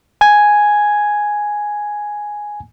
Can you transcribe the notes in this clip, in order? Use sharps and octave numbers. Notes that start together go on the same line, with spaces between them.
G#5 G#6